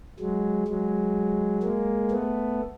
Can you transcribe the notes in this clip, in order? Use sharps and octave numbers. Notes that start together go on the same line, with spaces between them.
F#3 G#3
F#3 G#3
G#3 A#3
A3 B3